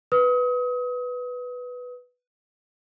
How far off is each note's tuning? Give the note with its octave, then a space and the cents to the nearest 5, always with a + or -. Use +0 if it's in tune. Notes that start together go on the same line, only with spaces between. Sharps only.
B4 +0 D#6 +35